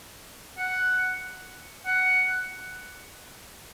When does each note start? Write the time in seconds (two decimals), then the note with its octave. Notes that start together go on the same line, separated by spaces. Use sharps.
0.58 F#5
1.86 F#5